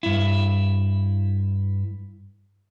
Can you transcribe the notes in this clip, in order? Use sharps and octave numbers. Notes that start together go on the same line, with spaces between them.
G2 E4